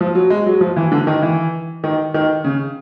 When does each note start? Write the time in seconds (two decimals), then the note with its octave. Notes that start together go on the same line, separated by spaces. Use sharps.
0.01 F3
0.15 F#3
0.30 G#3
0.46 F#3
0.61 F3
0.77 E3
0.92 D3
1.07 D#3
1.22 E3
1.84 D#3
2.14 D#3
2.44 C#3